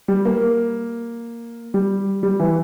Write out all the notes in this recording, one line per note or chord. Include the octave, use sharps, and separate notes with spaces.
G3
A#3
G3
G3
E3